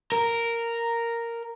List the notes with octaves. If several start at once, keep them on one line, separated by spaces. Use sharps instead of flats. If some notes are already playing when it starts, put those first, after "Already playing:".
A#4